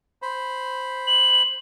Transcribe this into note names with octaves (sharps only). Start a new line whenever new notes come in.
C5 B5
F#7